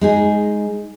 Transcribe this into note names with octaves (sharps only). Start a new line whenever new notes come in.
G#3 D#4 G#4